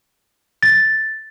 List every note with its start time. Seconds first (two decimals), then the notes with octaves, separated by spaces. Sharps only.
0.63 A6